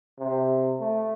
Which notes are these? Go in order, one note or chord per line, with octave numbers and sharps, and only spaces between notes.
C3
A3